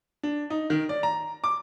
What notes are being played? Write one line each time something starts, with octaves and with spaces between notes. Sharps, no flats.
D4
D#4
D#3
D5
A#5
D6